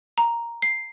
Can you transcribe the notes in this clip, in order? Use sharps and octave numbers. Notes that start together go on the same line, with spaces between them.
A#5
C7